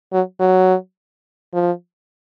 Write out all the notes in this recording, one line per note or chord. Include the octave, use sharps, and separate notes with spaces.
F#3
F#3
F3